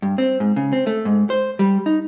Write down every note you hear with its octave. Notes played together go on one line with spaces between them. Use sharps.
G2
C4
G#2
C#3
C4
A3
G#2
C5
G3
D#4